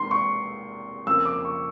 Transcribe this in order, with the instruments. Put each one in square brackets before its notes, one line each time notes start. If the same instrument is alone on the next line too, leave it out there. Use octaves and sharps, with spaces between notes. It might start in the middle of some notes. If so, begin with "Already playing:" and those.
Already playing: [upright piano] E2 C3 D#3 G#3 [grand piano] C6
[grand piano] C#6
[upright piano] F2 C#3 F3 A#3 [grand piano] E6
[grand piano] D6
C#6